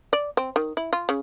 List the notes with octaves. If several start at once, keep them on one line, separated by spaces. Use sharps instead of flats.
D5
C4
D#3
E4
F4
C#3